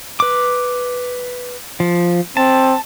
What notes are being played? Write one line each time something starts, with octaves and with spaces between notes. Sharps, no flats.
B4 D6
F3
C4 A5